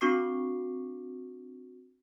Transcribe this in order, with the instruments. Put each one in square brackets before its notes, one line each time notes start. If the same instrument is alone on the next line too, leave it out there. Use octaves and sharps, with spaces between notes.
[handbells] C4 D4 F#4 C#6 D6 C7